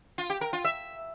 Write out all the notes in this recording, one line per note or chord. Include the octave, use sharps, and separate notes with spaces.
F4
G4
A#4
F4
E5